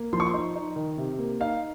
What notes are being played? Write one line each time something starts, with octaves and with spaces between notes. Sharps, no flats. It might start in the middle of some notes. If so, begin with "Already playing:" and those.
Already playing: A#3
F3 C6
C#6
C6
D#4
D#4
D#3
C3
A#3
D#4 F5